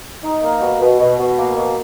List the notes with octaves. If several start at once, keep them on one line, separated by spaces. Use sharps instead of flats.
D#4
A#3
B2
B2
B2
B2
A#3
B2